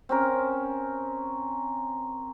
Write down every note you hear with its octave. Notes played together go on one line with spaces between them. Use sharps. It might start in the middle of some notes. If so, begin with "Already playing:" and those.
C4 C#4 A#4